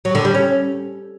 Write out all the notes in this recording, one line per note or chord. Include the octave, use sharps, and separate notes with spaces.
F#3
D3
G3
C#4